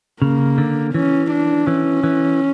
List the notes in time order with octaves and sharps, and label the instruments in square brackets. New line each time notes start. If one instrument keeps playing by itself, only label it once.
[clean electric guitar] C#3 [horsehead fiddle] A#3
[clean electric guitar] D3
[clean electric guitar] E3 [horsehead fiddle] C#4
[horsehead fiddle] D4
[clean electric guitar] E3 [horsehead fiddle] C#4
[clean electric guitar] E3